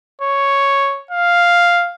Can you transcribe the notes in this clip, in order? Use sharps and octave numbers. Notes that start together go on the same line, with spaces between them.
C#5
F5